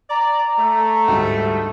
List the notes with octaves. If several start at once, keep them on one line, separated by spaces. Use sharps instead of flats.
D5 A#5
A3
D2 G#2 G3